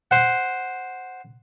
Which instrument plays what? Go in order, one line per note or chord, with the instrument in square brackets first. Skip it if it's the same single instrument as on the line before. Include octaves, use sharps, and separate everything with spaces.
[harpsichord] C5 F#5